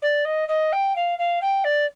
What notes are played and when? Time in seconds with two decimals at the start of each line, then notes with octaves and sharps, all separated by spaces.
0.02 D5
0.24 D#5
0.48 D#5
0.72 G5
0.95 F5
1.18 F5
1.41 G5
1.64 D5